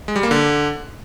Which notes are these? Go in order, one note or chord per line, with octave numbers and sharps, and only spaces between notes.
G#3
G3
A#3
D3